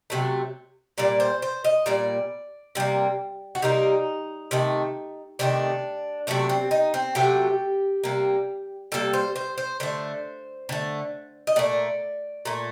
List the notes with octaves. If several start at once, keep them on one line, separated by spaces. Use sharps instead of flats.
C3 F#3 A3
A#2 G3 A#3 D5
C5
C5
D#5
A#2 G3 A#3 D5
C3 G3 A#3
F#4
C3 G3 A#3 D#4
C3 D#3 A3
C3 D#3 A3 D4
C3 F#3 A3 D4
C4
D#4
C4
C3 F#3 A3 G4
C3 G3 A#3
C3 G3 A#3 A4
C5
C5
C5
D3 A3 C5
D3 A3
D#5
A#2 A3 D5
A#2 A3